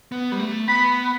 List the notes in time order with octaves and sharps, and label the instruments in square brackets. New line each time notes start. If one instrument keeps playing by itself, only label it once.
[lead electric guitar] B3
G3
A3
[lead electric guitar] B3 [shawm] B5